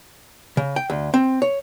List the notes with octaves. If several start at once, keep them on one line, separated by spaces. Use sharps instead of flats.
C#3
G5
D2
C4
C#5